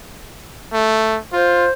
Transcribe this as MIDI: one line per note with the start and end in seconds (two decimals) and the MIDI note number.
0.73 1.19 57
1.33 1.67 65
1.33 1.72 72